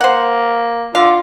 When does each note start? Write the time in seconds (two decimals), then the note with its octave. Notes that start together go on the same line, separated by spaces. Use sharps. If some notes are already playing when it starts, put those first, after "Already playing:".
0.01 A#3 C5 F#5
0.95 D3 F4 F5